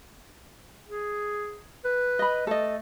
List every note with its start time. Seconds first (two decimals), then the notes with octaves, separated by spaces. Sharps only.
0.89 G#4
1.85 B4
2.19 D#5 B5
2.47 A3 A4 D#5